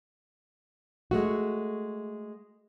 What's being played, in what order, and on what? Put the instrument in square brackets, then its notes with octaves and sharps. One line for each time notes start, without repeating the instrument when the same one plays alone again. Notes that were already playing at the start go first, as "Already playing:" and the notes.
[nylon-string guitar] G#3 A3 F#4